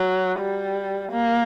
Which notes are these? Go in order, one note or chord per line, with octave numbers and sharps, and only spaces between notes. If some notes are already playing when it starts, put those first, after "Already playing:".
Already playing: F#3
G3
A#3